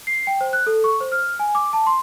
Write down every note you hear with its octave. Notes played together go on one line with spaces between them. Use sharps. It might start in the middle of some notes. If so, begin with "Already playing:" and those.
C7
G5
C5
F#6
A4
C#6
C5
F6
G#5
D6
A5
C6